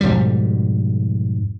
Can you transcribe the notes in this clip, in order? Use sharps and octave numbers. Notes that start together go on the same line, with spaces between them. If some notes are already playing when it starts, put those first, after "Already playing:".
F2 G#2 B2 G3